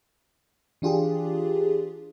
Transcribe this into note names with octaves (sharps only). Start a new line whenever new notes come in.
E3 D4 F4 G4 G#4